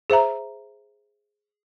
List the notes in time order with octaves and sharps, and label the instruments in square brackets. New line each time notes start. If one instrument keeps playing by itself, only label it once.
[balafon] G#4 C5 E5 A#5